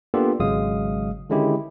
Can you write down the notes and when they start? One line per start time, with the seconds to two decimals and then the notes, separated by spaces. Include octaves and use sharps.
0.14 A#3 B3 D4 F4 G4 A4
0.40 G#1 C#3 F#3 G#3 F5 D#6
1.30 D3 D#3 G#3 C#4 E4 G4